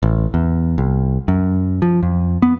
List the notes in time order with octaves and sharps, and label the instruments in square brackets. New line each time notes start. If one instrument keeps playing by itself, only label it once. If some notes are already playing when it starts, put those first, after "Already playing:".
[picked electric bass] A1
E2
C2
F#2
F3
F2
B3